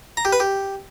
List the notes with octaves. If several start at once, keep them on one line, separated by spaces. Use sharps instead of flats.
A#5
G4
B4
G4